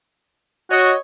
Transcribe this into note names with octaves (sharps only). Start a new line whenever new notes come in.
F#4 C#5 D#5